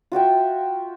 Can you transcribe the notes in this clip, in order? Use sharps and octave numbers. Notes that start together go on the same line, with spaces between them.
F4 F#4 E5 G5